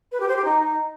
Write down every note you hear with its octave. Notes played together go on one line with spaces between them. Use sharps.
B4
G4
C5
G4
D#4